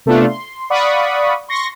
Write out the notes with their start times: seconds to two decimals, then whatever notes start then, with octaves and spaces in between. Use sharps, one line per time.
0.06 C3 A3 B3 D4 F4
0.28 C6
0.70 D5 F5 F#5 B5 C#6 D#6
1.48 C6 C#6 A#6